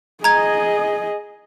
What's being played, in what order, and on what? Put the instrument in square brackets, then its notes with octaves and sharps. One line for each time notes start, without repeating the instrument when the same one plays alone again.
[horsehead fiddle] G#4 D#5 [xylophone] A#5 G#6